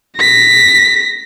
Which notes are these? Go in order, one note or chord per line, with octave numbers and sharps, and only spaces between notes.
A#6 B6